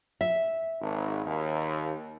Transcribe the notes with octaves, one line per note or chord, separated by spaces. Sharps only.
E5
G#1
D#2